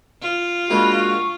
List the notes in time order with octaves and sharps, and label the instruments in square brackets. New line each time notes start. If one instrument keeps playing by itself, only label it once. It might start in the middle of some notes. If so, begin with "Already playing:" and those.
[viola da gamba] F4
[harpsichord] G#3 A#3 D4 [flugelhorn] F#4 [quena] B5
[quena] C#6